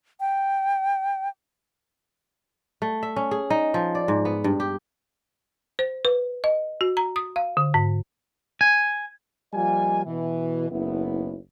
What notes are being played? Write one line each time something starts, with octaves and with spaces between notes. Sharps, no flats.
G5
A3
E5
C#4
G#4
D#4
F3
D5
G#2
B3
G2
G4
C5
B4
D#5
F#4
A#5
D#6
F5
D3
G#2
G#5
F3 G3 A#3 F4 D#5 G#5
B2 E3
F#1 B1 B3 E4